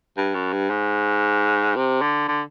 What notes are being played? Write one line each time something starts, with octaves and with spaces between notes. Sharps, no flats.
G2
F#2
G2
G#2
C3
D3
D3